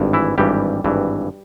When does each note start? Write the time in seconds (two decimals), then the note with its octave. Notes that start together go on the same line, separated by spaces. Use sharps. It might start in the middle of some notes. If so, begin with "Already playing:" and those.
Already playing: G#1 G2
0.13 E3 E4
0.38 G#1 G2 E3 G3 G4
0.84 G#1 G2 E3